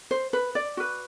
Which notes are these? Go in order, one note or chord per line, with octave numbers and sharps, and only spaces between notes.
C5
B4
D5
F#4 B4